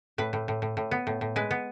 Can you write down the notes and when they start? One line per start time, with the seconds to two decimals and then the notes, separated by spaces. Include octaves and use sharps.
0.18 A2 B4
0.33 A2
0.48 A2
0.62 A2
0.77 A2
0.91 B3
1.07 A2
1.21 A2
1.36 G#3 B4
1.51 B3